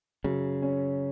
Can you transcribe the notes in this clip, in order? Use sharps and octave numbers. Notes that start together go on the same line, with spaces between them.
F#2 C#3
C#4